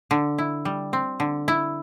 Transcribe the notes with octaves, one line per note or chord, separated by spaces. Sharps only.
D3
E4
G3
C4
D3
E4